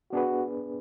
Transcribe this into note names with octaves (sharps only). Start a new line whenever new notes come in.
B3 D4 F#4 G#4 B4